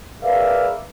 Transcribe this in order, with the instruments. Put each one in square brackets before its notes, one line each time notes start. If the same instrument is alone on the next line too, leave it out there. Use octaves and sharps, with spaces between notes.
[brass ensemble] G#4 A#4 B4 D5 E5 F5